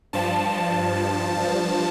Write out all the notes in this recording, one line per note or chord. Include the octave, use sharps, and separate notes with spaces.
G2 F3 A5
G2 F3